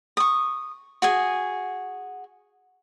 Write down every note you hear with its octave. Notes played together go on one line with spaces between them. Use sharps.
C#6 D#6
F#4 G#4 G#5